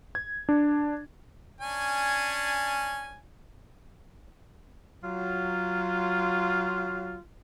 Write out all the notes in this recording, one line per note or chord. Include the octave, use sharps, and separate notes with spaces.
G#6
D4
C#4 D4 G#5
F#3 F4